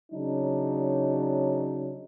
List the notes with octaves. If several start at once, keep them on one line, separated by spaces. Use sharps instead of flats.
C#3 F#3 D4 D#4